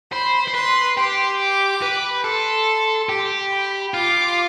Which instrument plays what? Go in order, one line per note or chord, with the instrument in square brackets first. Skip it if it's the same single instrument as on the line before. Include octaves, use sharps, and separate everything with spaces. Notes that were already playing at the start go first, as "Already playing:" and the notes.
[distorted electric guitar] C5 [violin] B5
[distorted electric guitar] C5
[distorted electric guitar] B4 [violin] C6
[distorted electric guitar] G4 [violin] C6
[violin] D6
[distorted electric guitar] B4
[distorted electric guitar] A4 [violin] C6
[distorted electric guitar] G4
[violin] B5
[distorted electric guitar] F4 [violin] D6